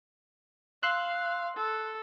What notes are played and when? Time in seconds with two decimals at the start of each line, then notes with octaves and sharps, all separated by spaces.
0.83 F5 C6 E6 F#6
1.57 A4